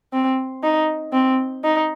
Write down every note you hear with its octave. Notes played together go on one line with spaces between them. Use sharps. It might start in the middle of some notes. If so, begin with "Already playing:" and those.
C4
D#4
C4
D#4